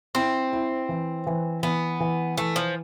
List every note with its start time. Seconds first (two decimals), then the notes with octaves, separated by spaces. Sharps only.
0.15 C4 E4
0.52 E4
0.89 E3
1.27 E3
1.63 E3 B3
2.00 E3
2.37 E3 A3
2.56 F3